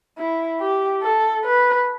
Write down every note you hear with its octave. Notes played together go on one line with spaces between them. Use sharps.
E4
G4
A4
B4